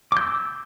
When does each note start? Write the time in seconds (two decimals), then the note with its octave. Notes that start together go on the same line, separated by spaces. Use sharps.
0.12 D6
0.17 G6
0.21 E6